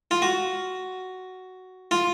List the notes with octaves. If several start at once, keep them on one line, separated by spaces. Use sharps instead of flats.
F4
F#4
F4